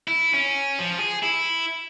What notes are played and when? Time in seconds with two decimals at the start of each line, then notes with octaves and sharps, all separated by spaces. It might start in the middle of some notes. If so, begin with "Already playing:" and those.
0.08 E4
0.33 C#4
0.79 F3
0.99 G#4
1.23 E4